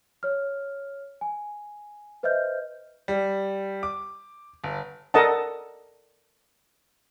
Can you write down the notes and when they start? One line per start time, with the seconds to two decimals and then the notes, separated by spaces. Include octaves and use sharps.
0.23 C#5 F6
1.21 G#5
2.23 B4 C5 D#5 E5 F6 G6
3.08 G3
3.83 D6
4.64 G1
5.14 A4 A#4 D5 D#5 F#5 A5